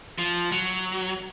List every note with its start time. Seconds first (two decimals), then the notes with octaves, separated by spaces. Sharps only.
0.18 F3
0.52 F#3